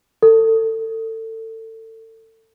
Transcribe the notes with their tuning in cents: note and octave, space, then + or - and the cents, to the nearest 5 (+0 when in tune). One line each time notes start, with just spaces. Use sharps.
A4 +30